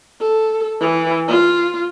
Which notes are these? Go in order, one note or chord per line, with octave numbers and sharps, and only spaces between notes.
A4
E3
F4